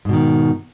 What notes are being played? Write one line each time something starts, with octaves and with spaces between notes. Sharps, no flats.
G#2 B2 D#3